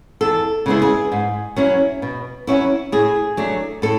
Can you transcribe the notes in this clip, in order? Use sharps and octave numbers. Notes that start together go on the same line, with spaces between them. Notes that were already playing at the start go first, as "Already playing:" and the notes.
E2 A4
C#3 G#3 B3 E4
G#4
G#2
F#3 C#4 E4
B2
F#3 C#4 E4
A2 G#4
F#3 A3 D4
A2 A4